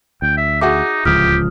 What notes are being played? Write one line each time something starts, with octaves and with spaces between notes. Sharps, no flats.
D2 G5
E5
D#4 F#4 G#4 E5 D6
D1 C#2 F3 F4 G4 D#6 F6